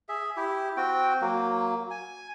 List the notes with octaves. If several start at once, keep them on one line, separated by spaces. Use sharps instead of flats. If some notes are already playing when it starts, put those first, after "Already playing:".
G#4 E5
E4 G4
C4 F#4 G5
F#3 A#3
G#5